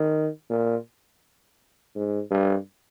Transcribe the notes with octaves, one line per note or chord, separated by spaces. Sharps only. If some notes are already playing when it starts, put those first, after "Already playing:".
Already playing: D#3
A#2
G#2
G2